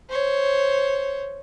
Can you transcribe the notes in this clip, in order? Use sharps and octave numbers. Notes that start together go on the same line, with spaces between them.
C5 C#5